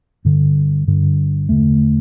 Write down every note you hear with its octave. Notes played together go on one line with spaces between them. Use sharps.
G2 D3
G2 D3
E2 D3 A3